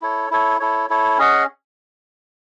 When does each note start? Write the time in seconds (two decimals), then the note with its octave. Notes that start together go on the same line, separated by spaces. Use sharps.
0.02 E4 A4 C#5
0.31 E4 A4 C#5
0.60 E4 A4 C#5
0.90 E4 A4 C#5
1.18 C#4 G#4 D#5 F#5